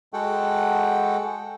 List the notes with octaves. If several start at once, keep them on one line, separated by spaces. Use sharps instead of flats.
G#3 F#4 A4 F#5 G5